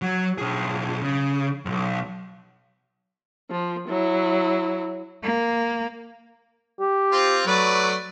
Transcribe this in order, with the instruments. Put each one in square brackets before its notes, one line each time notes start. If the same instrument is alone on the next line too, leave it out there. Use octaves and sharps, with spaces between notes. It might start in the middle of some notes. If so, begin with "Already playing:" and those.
[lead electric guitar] F#3
B1 G#4
C#3
B1 F2
[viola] F3
F#3 E4
[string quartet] A#3
[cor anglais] G4
[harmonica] C4 F4
[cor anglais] F#3 [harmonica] A3 B4 D5